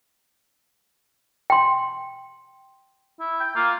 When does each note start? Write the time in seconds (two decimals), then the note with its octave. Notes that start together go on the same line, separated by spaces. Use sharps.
1.50 G5 C6
3.20 E4
3.41 G5
3.56 A#3 F4